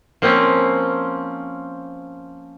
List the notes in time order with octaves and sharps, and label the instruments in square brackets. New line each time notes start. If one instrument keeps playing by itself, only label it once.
[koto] F3 A#3 C4 C#4